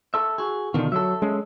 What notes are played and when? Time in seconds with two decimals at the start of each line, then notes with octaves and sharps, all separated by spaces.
0.14 A4 E5
0.38 F#4 G#4
0.74 B2 D3 D#3 D4 F4
0.92 F#3 A4 E5
1.22 G#3 C#4